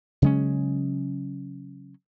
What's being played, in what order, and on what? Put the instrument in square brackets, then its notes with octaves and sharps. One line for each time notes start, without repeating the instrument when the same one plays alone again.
[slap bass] C#3 F#3 G#3 C#4